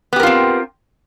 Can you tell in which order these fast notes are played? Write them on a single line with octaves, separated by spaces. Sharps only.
B3 G4 A#4 F4 C4